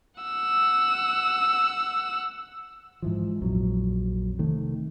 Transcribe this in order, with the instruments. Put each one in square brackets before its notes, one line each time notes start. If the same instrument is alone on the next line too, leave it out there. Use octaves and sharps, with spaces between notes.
[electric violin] F#5 E6
[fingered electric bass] G#2 E3 F3
A#1 F2 F#3
C3 D#3 A3